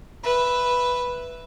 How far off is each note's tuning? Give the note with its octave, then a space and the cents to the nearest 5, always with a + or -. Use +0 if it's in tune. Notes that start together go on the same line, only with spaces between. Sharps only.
B4 +0 E5 +0